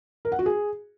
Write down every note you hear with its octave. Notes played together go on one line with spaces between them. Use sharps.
A#4
F#5
F#4
G#4